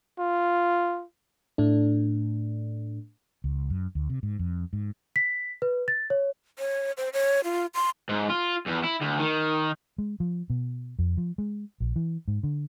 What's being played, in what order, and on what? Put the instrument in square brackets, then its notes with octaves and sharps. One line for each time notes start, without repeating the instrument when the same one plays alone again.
[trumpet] F4
[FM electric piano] A2 A3 D4
[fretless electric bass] C#2
F#2
D2
C3
G#2
F2
G#2
[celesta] B6
B4
A6
C#5
[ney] C#5
C5
C#5
F4
C6
[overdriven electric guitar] G#2
F4
E2
E4
D2
D#3
[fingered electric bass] G#3
F3
B2
F2
F3
G#3
A#1
E3
G#2
D3